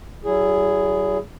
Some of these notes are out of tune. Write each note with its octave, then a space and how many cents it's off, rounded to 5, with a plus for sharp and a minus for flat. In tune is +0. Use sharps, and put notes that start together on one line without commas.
F#3 +45 E4 +15 G#4 +0